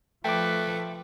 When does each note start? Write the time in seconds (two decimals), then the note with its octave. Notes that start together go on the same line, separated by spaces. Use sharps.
0.24 F3 A3 B4 G5 D6